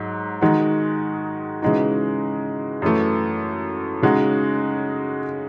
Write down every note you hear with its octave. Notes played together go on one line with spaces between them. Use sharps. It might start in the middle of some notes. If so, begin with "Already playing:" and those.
Already playing: G#2 F#3
D#3 G#3 D#4 F#4
C#3 E3 G#3 D#4 F#4
F#2 E3 A3
C#3 G#3 D#4 F#4